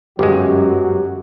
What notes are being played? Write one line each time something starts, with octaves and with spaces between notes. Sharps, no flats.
G1 F#2 F#3 G#3 F#4 G4